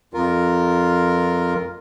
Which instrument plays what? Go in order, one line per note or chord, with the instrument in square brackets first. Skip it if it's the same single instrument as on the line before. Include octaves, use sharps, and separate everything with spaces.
[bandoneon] F2 F4 A#4